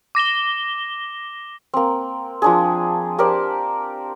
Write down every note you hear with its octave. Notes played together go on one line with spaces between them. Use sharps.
D6 A#6 E7 G7
A#3 C4
F3 D4 G#4
G4 A#4 C5 D5